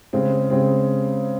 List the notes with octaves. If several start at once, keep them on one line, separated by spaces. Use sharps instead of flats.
C#3 G#3 C4
C#3 G#3 C4